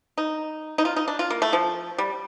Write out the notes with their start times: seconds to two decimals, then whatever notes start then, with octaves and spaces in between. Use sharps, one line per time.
0.18 D#4
0.78 D#4
0.85 F4
0.96 D#4
1.08 D4
1.19 F4
1.30 A#3
1.42 A3
1.53 F3
1.98 G3